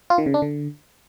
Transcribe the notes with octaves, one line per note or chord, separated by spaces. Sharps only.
F4
D#3
C#3
D4
D3